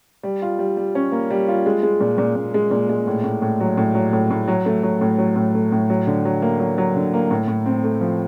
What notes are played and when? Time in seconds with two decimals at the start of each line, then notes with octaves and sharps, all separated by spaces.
0.23 G3
0.42 F4
0.59 G3
0.77 G3
0.95 C#4
1.12 A#3
1.30 G3
1.48 F4
1.66 G#3
1.83 G#3
2.01 A#2
2.18 A#2
2.35 A#2
2.54 G#3
2.71 A#2
2.89 G#3
3.07 A2
3.24 A2
3.42 A2
3.60 F#3
3.77 A2
3.95 F#3
4.13 A2
4.31 A2
4.48 F#3
4.66 A3
4.83 F#3
5.01 A2
5.18 F#3
5.36 A2
5.55 A3
5.72 A2
5.90 F#3
6.07 D3
6.25 F#3
6.42 A#3
6.60 F#3
6.78 F#3
6.96 D3
7.14 A#3
7.31 A2
7.48 A2
7.66 C4
7.84 A3
8.01 F3